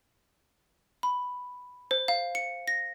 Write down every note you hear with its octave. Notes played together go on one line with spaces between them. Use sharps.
B5
C5
F5
C#7
A#6